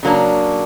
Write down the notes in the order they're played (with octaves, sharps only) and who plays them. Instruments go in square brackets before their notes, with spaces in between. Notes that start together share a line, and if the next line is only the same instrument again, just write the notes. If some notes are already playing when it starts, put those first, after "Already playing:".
[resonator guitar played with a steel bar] C#3 F#3 A#3 D4